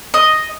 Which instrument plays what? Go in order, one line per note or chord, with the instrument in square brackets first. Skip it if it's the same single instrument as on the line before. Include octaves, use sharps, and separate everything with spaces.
[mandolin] D#5